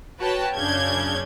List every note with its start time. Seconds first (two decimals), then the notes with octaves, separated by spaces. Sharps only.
0.20 F#4 B4 C#5 G5 A5
0.55 F#2 C#3 C#4 D4 G6 G#6